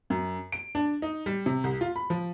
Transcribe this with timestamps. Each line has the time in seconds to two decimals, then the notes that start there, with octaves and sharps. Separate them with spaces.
0.10 F#2
0.52 D7
0.75 D4
1.02 D#4
1.26 G3
1.46 C3
1.64 C2
1.81 F4
1.96 B5
2.10 F3